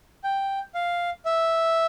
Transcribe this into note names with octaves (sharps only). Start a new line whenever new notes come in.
G5
F5
E5